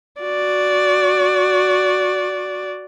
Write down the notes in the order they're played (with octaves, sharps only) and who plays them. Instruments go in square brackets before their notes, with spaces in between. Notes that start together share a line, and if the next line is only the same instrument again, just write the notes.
[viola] F#4 D5